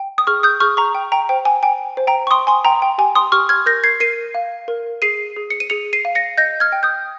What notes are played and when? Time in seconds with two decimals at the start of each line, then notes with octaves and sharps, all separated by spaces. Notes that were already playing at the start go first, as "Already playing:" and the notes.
Already playing: G5
0.18 D#6
0.27 G#4 C#6 F6
0.43 D#6 G6
0.60 G#4 C#6 F6
0.77 A#5 C#6
0.95 G5
1.12 G5 A#5
1.29 C5 G5
1.45 G#5
1.63 G5 G#5
1.97 C5
2.07 G5 A#5
2.27 C#6
2.31 G5 C6 D#6
2.47 G#5 C6
2.65 G5 A#5
2.82 G5
2.98 G4 G#5
3.15 C6 D#6
3.32 G4 C#6 F6
3.49 F6 G#6
3.66 A#4 G6 A#6
3.84 G#6 C7
4.00 A#4 C7 D#7
4.35 F5
4.68 A#4
5.02 G#4 C7 D#7
5.36 G#4
5.50 C#7
5.60 D#7
5.70 G#4 C#7 F7
5.93 C7 D#7
6.05 F5
6.15 A#6 C#7
6.38 D#5 G6 A#6
6.60 F6 G#6
6.72 G5
6.83 D#6 G6